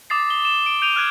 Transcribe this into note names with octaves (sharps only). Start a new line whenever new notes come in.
D6 D#6 A6 C7
G7
E7
D7
G6 D7 D#7 F7
F6 F#6 G#6 D7